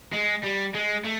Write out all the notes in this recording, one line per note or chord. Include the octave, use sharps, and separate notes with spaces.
G#3
G3
G#3
A3